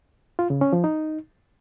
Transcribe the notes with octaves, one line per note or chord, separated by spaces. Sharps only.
F4
C#3
C#4
F3
D#4